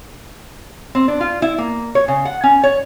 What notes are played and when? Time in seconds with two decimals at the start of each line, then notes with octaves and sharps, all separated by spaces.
0.95 C4
1.08 D4
1.21 F4
1.42 E4
1.58 A#3
1.95 C#5
2.08 C#3
2.25 F#5
2.43 C#4
2.63 C#5